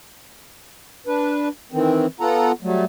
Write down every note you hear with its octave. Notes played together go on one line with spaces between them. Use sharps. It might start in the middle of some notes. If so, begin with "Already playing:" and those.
D4 B4
D#3 E3 C4
B3 F4 A4 F#5 A#5
F#3 G3 A3